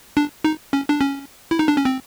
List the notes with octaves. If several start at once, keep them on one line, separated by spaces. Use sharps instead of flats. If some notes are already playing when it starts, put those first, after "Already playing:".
D4
D#4
C#4
D4
C#4
E4
D#4
D4
C#4
C4